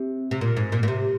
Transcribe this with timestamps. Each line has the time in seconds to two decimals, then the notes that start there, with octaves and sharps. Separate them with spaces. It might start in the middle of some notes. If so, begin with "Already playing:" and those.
Already playing: C3
0.31 C3
0.41 A#2
0.57 G#2
0.72 A#2
0.83 A#2
0.88 C3